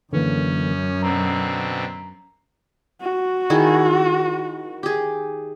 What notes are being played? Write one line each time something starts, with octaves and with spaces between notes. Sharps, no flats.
F#2 D3 E3 A#3 C#4
B2 D3 C4 A#5
F#4
D#3 E4 G#4
G4 G#4